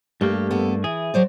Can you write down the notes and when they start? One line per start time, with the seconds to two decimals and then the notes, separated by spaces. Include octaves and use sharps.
0.21 G2 A3 A#3 G4
0.51 B3 A4
0.84 E3 G#4
1.14 F#3 C5 D5